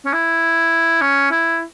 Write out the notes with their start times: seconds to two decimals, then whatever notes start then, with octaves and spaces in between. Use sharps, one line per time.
0.05 C#4
0.13 E4
1.01 C#4
1.31 E4